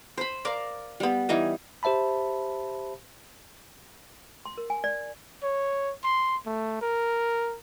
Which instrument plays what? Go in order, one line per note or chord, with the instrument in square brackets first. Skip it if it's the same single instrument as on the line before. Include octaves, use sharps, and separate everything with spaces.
[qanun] C5 B5
A#4 D5 F5
G3 B3
E3 G3 D#4 G#5
[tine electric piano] G4 C5 E5 A5 B5
[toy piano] C6
A#4
G#5
D5
[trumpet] C#5
C6
A3
A#4